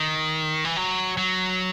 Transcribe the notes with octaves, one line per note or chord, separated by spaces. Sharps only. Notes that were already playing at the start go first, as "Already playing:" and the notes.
Already playing: D#3
E3
F#3
F#3